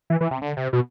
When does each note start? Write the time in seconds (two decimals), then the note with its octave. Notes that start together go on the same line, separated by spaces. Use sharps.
0.10 E3
0.21 E3
0.31 C3
0.41 D3
0.57 C3
0.73 B2